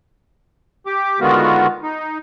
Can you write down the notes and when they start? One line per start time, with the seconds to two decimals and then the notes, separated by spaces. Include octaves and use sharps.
0.86 G4 D6
1.20 D3 D#3 G#3 B3 F4 F#4
1.83 D#4